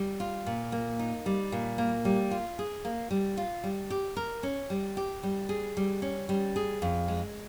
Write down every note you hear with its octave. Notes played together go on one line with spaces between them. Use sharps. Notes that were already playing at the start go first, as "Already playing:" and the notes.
Already playing: G3
F4
A#2
A#3
D#4
G3
A#2
A#3
G3
F4
G#4
A#3
G3
F4
G3
G4
A#4
C#4
G3
G4
G3
G#4
G3
C#4
G3
G#4
F2
G#3